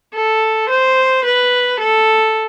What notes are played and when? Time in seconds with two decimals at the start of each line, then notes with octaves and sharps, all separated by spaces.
0.14 A4
0.69 C5
1.24 B4
1.80 A4